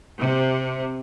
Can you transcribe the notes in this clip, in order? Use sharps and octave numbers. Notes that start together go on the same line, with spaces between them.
C3